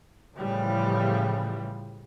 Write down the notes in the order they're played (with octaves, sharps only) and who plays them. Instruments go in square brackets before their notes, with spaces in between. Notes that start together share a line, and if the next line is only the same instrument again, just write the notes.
[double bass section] A2 C#3 E3 F3 G3